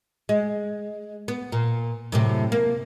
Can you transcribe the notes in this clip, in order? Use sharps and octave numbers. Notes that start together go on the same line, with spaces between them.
G#3
B3
A#2
F#2 A2 C3
A#3